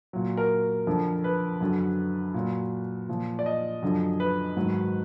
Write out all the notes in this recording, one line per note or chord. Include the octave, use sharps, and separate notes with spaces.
A#2 F#3
A#4
F2 D3 F3
B4
F#2 D3 F#3
A#2 F#3
A#2 F3
D5
D#5
F#2 D3 F3
B4
G#2 D#3 F#3